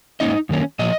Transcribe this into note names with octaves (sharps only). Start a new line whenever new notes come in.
G#2 F3 A#3 C#4 D#4 D#5
F#2 D#3 A#3 C#4
A#2 F3 D#5